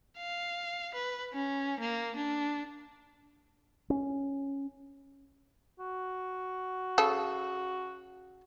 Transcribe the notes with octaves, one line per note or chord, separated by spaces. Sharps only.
F5
B4
C#4
A#3
D4
C#4
F#4
C#3 A4